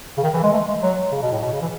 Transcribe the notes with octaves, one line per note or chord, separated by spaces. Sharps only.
C#3
D#3
E3
G#3
A3
G#3
F#3
C#3
B2
A2
B2
C#3
E3